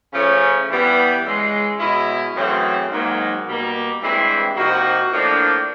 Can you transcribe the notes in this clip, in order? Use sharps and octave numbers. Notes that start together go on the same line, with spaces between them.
C#3 F3 A3 C#4
E3 G3 B3
C#3 E3 G#3
B2 G#3 C#4 E4
F#2 C#3 E3 A3 C4
G#2 D#3 F#3 A#3
B2 G3 A#3
G2 E3 G#3 C4 E4
C3 F3 A#3 D#4 F#4
A2 F3 A#3 D4